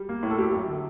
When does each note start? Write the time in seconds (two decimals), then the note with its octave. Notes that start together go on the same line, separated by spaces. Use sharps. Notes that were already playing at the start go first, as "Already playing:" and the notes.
Already playing: G3
0.09 A#3
0.23 A2
0.30 A4
0.38 A3 G4
0.53 F#2
0.68 D3